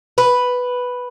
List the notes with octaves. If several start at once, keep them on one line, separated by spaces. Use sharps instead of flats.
B4